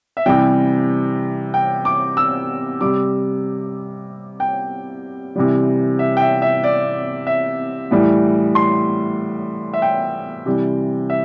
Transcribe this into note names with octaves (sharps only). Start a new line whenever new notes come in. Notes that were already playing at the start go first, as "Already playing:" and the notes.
E5
C3 E3 G3 G5
G5
D6
E6
C3 G3 D6
G5
C3 E3 G3
E5
G5
E5
E5
D5
E5
A2 E3 G3
C6
E5
G5
C3 E3 G3
E5